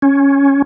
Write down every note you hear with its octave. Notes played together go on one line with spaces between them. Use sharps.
C#4